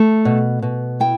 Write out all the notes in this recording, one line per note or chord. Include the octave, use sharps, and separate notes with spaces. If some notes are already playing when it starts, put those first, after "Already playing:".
Already playing: A3
B2
B2
E4 G5